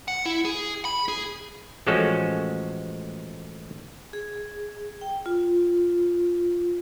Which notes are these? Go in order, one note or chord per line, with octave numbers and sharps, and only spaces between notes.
F#5
E4
G#4
B5
G#4
A1 F3 G#3 C#4 F#4 A4
G#4
G5
F4